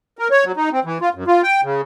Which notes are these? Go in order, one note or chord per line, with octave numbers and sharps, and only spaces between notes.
A#4
C#5
F#3
D#4
C4
E3
F4
F#2
F4
G5
C#3